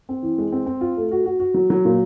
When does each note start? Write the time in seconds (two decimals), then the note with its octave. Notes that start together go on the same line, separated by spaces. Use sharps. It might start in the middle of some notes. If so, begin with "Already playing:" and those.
0.09 C4
0.23 E3
0.38 G#3
0.52 C4
0.66 C4
0.81 F4
0.97 A3
1.12 F#4
1.26 F#4
1.40 F#4
1.54 F#3
1.70 F#3
1.85 A#2